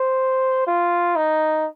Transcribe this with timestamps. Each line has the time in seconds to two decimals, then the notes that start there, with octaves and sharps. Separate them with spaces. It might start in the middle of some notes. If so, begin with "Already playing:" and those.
Already playing: C5
0.67 F4
1.16 D#4